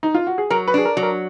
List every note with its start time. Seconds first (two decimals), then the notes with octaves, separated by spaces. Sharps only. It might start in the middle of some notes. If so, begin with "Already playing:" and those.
0.03 D#4
0.15 F4
0.27 F#4
0.38 G#4
0.50 F#3 A#4
0.68 B4
0.74 D4 G#4
0.85 A#4
0.97 F#3
1.03 A#4